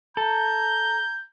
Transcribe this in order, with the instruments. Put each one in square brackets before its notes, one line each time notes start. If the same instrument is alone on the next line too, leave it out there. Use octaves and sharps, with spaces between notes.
[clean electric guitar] A4 [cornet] A#5 [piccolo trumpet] G6